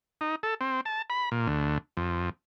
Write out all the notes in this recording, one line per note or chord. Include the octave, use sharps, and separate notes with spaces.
D#4
A4
C4
A5
B5
A#2
D2
F2